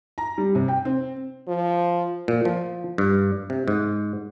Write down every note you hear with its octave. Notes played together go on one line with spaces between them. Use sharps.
A#5
G3
C3
G5
C4
F3
A#2
F3
G2
C3
G#2